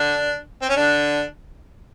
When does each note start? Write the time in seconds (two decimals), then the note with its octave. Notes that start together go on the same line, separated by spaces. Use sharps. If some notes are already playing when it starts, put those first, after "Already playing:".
Already playing: D3 D4
0.62 C4
0.69 C#4
0.76 D3 D4